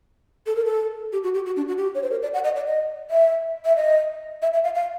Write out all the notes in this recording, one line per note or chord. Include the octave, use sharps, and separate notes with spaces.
A4
A#4
A4
G4
F#4
G4
F#4
D4
F#4
G4
C#5
C5
A#4
D5
F#5
D#5
D5
D#5
E5
E5
D#5
E5
E5
F5
F5